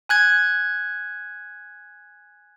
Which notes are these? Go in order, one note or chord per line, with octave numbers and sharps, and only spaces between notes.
G#5 F#6 G#6